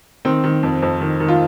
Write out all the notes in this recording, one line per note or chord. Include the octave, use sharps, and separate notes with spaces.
D#3 C4
D#3
F2
F2
D#3
D#3
F4